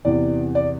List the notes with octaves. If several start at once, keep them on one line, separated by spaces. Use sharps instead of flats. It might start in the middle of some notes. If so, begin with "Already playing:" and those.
E2 C3 E3 D5
D5